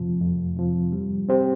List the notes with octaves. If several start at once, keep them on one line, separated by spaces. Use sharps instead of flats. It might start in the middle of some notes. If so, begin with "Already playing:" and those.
Already playing: F2 C3 F3
F2
C3 F3
G3
C4 G4 C5